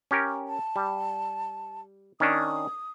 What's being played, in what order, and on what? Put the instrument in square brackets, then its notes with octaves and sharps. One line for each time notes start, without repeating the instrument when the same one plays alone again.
[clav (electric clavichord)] C#4 G4 A#4
[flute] A5
[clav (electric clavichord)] G3
[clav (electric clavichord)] D#3 C#4 D4 [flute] D#6